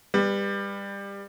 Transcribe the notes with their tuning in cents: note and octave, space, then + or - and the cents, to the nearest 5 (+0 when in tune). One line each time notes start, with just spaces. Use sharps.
G3 +25 B4 +0